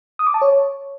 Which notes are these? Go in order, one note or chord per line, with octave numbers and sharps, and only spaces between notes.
D#6
D6
A5
C#5